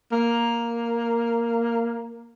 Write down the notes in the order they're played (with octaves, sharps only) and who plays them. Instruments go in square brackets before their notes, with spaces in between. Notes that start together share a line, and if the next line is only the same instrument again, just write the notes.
[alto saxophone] A#3